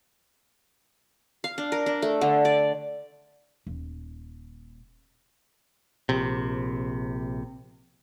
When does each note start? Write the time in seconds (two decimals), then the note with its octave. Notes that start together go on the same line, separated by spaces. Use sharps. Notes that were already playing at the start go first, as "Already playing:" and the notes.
1.44 F5
1.58 D4
1.72 A#4
1.86 D4
2.02 A3
2.21 D3
2.45 D5
3.67 D#1
6.09 A#1 C3